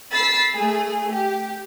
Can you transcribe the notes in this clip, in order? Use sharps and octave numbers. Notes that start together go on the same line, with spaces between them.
B5 E6 A6 B6 C7
A3 G#4
G4